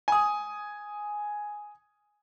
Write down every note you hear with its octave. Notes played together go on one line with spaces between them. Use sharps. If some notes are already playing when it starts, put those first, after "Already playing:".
G#5 D#6